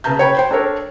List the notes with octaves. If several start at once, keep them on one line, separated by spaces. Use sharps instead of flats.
C#3 B4 A5 A#5 G6
C#5 G5 B5
C5 G5
D4 A4 A#4 C#5